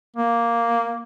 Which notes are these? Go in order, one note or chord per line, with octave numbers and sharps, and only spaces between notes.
A#3